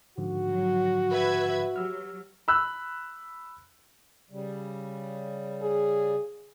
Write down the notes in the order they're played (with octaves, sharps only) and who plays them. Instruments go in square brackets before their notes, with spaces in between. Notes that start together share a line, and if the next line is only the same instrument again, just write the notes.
[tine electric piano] G#2 D3 F3 [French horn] F#4
[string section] F#3
B4 E5 G#6
[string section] F#3 [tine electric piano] G4 E6 F6
[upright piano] B5 E6 F#6
[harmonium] C#3 G3
[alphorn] G#4